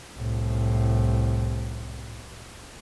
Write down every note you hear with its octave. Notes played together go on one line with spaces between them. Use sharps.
C2 A2